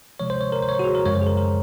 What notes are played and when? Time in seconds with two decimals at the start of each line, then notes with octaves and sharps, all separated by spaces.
0.20 C3 F3 G#3 C#5
0.30 C5
0.41 C#5
0.52 A#4
0.62 C5
0.69 C#5
0.73 C5
0.79 F#4
0.84 G#4
0.95 A#4
1.05 F#2 C#3 F3 G#3 C#5
1.15 C5
1.21 G#4
1.27 A#4
1.37 A#4